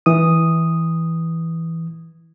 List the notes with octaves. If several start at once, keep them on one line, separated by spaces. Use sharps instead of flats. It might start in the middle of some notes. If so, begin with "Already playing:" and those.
E3 D#6